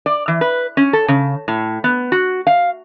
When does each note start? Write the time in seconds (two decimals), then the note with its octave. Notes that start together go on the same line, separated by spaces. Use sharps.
0.06 D5
0.28 E3
0.41 B4
0.77 C#4
0.93 A4
1.08 C#3
1.48 A2
1.84 B3
2.12 F#4
2.47 F5